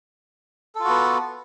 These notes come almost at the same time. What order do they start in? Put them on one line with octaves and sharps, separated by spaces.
A4 F4 F#4 B3